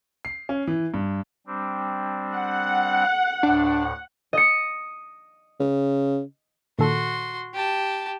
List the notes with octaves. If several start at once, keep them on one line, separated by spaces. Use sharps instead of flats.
C7
C#4
E3
G2
G3 C4 D4
F#5
D2 A2 D4
D#5 C#7
C#3
A#2 D#3 F#4 A4 C6
G4 A5